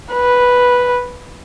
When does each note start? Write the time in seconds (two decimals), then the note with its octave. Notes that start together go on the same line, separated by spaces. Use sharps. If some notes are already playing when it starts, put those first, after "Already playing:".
0.13 B4